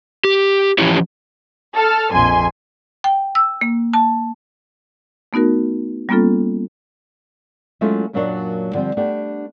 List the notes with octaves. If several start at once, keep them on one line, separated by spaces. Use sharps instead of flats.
G4
E3 F3 C#4 E4 G4 C#5
A4 F6
A#1 F2 G#5 C6
G5
E6
A#3
A5
A3 B3 D#4 F#4 A#4
G3 A#3 B3 C#4 F4 A4
F#3 G#3 A3 C#4 E4 F4
F#2 A#2 F#3 A#3 D4 C#5
D3 F3 G3 C4
A3 B3 D4 G4